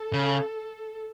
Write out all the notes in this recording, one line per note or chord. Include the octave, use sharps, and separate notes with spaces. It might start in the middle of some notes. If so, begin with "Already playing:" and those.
Already playing: A4
C#3